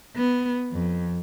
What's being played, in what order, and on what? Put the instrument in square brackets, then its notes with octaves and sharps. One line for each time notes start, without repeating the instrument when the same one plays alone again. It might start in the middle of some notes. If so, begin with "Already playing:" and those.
[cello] B3
F2